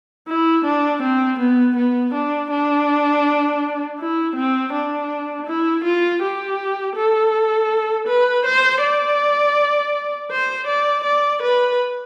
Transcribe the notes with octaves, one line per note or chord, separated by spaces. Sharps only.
E4
D4
C4
B3
B3
D4
D4
E4
C4
D4
E4
F4
G4
A4
B4
C5
D5
C5
D5
D5
B4